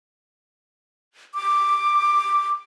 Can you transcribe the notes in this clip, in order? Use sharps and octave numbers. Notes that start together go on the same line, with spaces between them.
D6